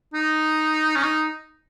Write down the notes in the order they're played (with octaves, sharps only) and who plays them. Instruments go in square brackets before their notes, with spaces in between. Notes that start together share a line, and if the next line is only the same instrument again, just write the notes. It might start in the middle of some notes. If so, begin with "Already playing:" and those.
[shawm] D#4
C#4
D#4